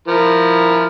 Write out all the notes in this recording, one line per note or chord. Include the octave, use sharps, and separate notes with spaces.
F3 E4 A#4